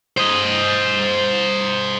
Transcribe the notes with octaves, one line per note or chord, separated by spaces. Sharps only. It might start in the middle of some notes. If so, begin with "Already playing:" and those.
C5 D#5